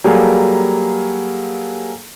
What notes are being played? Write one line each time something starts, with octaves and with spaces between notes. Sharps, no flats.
F#3 G3 A#3 G#4 A4 F5